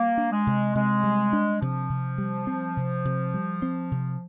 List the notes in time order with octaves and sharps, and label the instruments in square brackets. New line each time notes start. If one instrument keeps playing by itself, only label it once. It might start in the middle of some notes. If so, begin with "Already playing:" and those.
Already playing: [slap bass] G3 [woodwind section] A#3
[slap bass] D4
[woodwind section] G#3
[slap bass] C3
[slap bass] C3 [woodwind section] G#3
[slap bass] G3
D4
[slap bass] C3 [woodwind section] F3
[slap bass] C3
G3
C4
C3
C3
G3
C4
C3